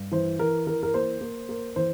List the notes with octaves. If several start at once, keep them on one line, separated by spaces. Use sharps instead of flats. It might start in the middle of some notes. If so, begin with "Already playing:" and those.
Already playing: G2
E3 C5
E3 A#4
E3 A#4
A#4
A#3 C5
A#3
A#3
E3 C5